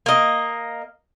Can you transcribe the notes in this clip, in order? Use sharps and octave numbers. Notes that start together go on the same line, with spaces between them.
A#3 D#5